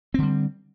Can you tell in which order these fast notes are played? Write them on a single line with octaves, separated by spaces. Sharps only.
C4 D3 G3